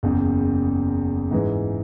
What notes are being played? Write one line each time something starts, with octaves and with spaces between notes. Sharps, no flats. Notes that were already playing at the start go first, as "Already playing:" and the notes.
F#1 E2 C#3
G#2 E3 G#3